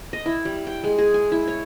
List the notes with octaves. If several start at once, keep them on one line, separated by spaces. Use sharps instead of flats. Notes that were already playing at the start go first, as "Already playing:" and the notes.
D#5
E4
G3
G5
G#3
G#4
G#5
E4
C#5